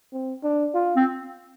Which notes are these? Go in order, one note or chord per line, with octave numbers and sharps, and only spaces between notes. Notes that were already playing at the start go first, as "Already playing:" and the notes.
C4
D4
F4
C4